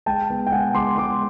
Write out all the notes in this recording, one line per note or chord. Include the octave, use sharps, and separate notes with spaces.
G#3 G5 A5
B3
G5
G#3 F#5 G#5
G#3 C6 D6
G#3 C6 D6